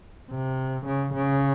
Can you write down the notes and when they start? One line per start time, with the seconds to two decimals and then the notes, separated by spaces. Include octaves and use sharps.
0.30 C3
0.86 C#3
1.14 C#3